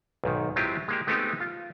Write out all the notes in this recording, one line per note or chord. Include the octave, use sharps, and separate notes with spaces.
B1 G#2 D#3
F#3 G#3 C4 E4 F4 G4
G#3 A#3 G4
G#3 A3 B3 C4 D#4 G4
F4